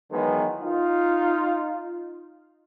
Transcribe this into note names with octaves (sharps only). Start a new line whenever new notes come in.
D#3 E3 F#3 G#3 B3
D#4 F4